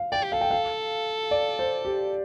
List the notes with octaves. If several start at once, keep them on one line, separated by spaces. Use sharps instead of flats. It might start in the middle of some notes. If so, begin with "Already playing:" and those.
Already playing: F5
D5 G5
G4
A4 F5
G5
F5
D5
C5
G4